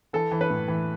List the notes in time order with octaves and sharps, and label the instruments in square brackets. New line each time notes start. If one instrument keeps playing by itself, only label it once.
[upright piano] E3 A4
E3
B4
A2
E3